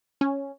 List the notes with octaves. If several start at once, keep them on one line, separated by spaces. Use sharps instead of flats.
C#4